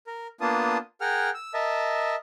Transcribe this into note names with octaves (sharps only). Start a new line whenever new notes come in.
A#4
A#3 B3 D4 F4 A5 D#6
G#4 A#4 F#5 G5 F6
E6
A#4 D#5 E5 A5